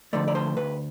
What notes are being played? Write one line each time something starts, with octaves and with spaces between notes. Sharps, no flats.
D3 F3 A3 D5
D5
C5
D2 B4